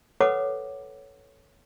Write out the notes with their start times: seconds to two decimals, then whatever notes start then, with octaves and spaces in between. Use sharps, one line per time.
0.20 A4 B4 C#5 F#5 B5 D6